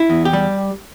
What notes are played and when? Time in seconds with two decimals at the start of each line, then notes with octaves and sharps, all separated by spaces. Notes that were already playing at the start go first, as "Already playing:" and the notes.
Already playing: E4
0.10 E2
0.25 G4
0.33 G3